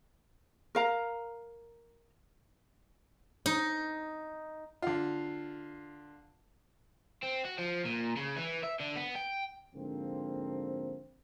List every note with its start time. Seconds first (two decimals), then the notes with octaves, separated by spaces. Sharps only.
0.75 A#4 F5 A#5
3.46 D#4
4.82 D3 F4
7.23 C4
7.45 F#4
7.58 F3
7.85 A#2
8.16 C#3
8.36 E3
8.64 E5
8.81 D3
8.97 B3
9.16 G5
9.75 G#2 D3 F3 A#3 C4